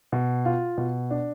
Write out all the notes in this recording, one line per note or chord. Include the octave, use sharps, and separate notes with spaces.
B2
F4
B2
D4